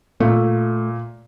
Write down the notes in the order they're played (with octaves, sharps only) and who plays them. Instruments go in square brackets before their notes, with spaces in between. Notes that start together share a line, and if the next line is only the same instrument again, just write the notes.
[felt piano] A#2 [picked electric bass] A3